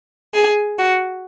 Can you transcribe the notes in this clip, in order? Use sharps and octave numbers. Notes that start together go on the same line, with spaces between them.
G#4
F#4